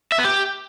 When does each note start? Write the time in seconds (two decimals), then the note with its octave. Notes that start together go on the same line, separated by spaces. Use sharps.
0.12 E5
0.18 B3
0.25 G4